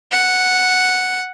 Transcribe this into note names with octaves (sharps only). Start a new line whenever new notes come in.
F#5